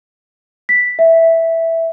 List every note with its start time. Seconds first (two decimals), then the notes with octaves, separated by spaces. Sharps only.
0.69 B6
0.99 E5